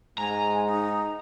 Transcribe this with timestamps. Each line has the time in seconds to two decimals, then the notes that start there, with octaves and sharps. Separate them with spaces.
0.18 G#2 G#3 G#5 A#5
0.67 D#4